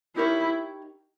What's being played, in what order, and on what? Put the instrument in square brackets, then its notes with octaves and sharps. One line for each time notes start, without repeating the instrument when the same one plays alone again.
[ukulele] D#4 G4 A#4 C#5 [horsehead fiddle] E4